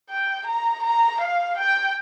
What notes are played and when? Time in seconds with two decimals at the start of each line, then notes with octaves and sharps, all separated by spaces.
0.10 G5
0.47 A#5
0.83 A#5
1.21 F5
1.58 G5